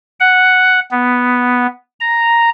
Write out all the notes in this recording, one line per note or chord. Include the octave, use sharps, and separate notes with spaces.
F#5
B3
A#5